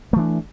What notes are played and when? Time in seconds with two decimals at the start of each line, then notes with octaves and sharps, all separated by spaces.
0.13 A3
0.16 E3
0.19 D4